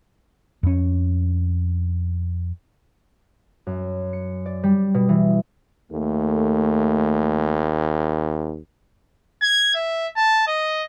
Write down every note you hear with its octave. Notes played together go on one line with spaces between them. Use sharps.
F2 C#4
F#2
C#7
D5
G3
B2
E3
D#2 A3
G#6
E5
A5
D#5